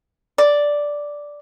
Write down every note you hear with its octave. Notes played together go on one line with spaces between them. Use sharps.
D5